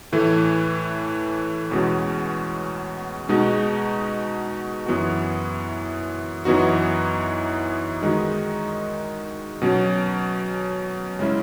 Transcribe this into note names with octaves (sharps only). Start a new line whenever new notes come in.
A2 E3 A3
E2 B2 G#3 C#4 F#4
B2 G#3 D#4 F#4
F#2 E3 B3 F#4
F#2 E3 B3 D#4 F#4
D#3 G#3 D#4 F#4
B2 F#3 C#4
C#3 G#3 C#4 E4